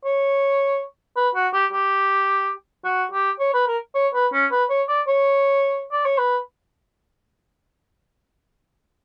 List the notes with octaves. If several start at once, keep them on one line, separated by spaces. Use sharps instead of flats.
C#5
B4
F#4
G4
G4
F#4
G4
C#5
B4
A#4
C#5
B4
C#4
B4
C#5
D5
C#5
D5
C#5
B4